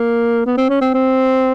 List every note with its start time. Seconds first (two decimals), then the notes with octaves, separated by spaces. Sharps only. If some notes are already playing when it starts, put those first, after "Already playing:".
Already playing: A#3
0.46 B3
0.57 C4
0.69 C#4
0.81 C4
0.94 C4